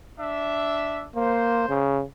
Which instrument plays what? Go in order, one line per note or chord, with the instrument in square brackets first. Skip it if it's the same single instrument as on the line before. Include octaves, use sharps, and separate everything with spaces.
[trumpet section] D4 E5
[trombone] A#3 [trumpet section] C5
[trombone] C#3